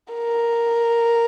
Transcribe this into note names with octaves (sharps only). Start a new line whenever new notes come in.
A#4